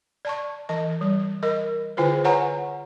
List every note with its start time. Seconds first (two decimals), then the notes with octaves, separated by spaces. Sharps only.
0.25 D5 A5 C#6
0.69 E3 D#5
1.01 G3
1.43 A#4 D#5
1.97 D3 E4 F4 B4 C5
2.24 B4 C#5 F#5 G#5 A#5 C#6